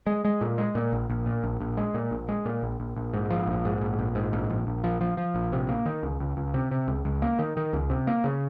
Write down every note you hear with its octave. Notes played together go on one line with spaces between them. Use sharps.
G#3
G#3
A#2
G#3
A#2
A#1
A#1
A#2
A#1
A#1
G#3
A#2
A#1
G#3
A#2
A#1
A#1
A#1
G#2
F3
A#1
G#2
A#1
A#1
G#2
A#1
A#1
A#1
F3
F3
F3
A#1
C3
A#3
D#3
C#2
C#2
C#2
C3
C3
C#2
C#2
A#3
D#3
D#3
C#2
C3
A#3
C#3